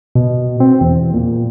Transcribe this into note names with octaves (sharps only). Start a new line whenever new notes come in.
B2
C4
E2
A#2